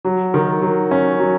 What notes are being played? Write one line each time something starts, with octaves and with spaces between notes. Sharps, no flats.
F#3
D#3
F#3
C#4
F#3